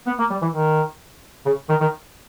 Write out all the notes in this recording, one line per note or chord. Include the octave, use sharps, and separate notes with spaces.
B3
A#3
G3
E3
D#3
C#3
D#3
D#3